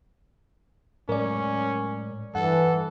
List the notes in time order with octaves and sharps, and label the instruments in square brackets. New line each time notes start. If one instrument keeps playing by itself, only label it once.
[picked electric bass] A2 F#3 G#3 [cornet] C#4 [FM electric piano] A#4 D5
[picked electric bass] G2 [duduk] E3 [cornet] A4 [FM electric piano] F#5